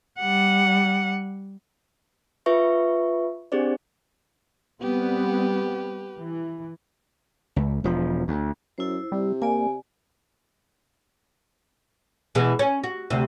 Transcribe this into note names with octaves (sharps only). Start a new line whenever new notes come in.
G3 F#5
F4 B4 E5 C#6
C4 D4 G4 G#4 C5 D5
G3 B3 C4 G4 B4
E3
C#2
E1 F3
D2
F#2 E4 C5
C3 G3
A#3 D5 G#5
B2 E3 G#3
C#4
F#4
D2 C3